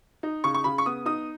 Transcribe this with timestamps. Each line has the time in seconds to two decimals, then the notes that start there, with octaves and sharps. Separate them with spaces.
0.23 D#4
0.44 C#3 C#6
0.54 C#6
0.64 C#3 B5
0.78 C#6
0.86 B3 D#6
1.06 D#4 D#6